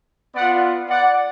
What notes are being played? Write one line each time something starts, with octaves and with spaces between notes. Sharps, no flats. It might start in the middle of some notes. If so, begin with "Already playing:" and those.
B3 F4 D5 F#5
D5 F#5